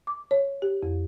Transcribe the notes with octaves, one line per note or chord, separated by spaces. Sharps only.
D6
C#5
G4
F2